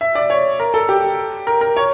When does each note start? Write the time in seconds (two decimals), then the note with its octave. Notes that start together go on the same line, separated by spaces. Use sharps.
0.01 E5
0.15 D5
0.30 C#5
0.60 A#4
0.74 A4
0.89 G4
1.47 A#4
1.61 A#4
1.77 C#5